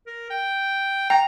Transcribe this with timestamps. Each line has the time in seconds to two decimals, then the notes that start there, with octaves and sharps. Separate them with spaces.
0.06 A#4
0.30 G5
1.10 G5 A#5